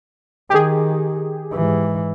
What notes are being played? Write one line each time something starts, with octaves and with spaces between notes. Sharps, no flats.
D#3 G4 G#4
G#2 E3